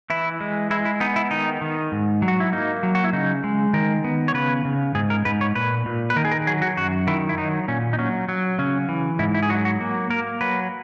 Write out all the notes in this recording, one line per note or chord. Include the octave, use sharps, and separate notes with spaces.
E3 E4
G#3
G#3 E4
E4
B3 D#4
E4
D#3 D#4
D#3
G#2
F#3
F#4
E4
A#3 D#4
F#3
F#4
E4
C#3 D#4
G#3
D#3 A#4
B3
C#5
C#3 B4
C#3
G#2 G#4
A#4
G#2 B4
C#5
A#2 B4
A#2
B4
D#3 A#4
G#4
A#4
F#3 G#4
F#4
F#2 F#4
D#3 E4
E4
F#3 D#4
A#2 C#4
D#4
F#3 C#4
F#3
C#3 C#4
E3
G#2 E4
E4
G#4
F#3 F#4
F#4
A#3
A#3 A#4
F#3 B4